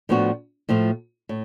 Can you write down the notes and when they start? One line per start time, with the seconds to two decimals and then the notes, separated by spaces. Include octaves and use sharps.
0.09 A2 F3 B3 D4 F#4
0.69 A2 F3 A3 F4
1.29 A2